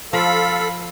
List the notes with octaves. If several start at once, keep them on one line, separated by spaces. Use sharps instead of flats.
F3 A4 F5 B5